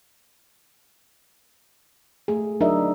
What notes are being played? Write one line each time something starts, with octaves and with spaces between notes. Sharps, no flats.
A3 G#4
F#3 D4 D#4 A#4 D#5 E5